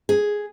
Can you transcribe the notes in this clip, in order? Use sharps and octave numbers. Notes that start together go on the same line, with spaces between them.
G#4